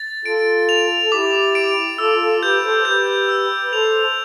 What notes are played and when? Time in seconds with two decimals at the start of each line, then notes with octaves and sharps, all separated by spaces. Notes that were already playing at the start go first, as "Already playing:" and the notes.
Already playing: A6
0.25 F4 A4 D7
0.69 F7
1.03 A4
1.12 E4 G4 D6
1.55 D7
1.98 F4 A4 E6
2.21 F4 A4
2.42 G4 B4 G6
2.64 A4 C5
2.85 G4 B4 G6
3.29 E6
3.62 B4
3.72 A4 C5 F7